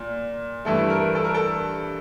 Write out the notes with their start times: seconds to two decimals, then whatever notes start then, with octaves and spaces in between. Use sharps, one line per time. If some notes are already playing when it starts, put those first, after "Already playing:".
Already playing: A#2
0.65 G2 E3 A3 A4
0.90 A#4
1.15 A4
1.24 A#4
1.34 A4